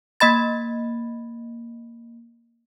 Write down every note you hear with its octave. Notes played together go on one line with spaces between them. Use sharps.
A#3 D#5 B5 A6